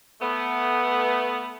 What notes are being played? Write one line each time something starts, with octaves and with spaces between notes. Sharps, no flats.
A3 B3